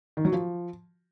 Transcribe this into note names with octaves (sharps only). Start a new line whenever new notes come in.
D#3
F#3
F3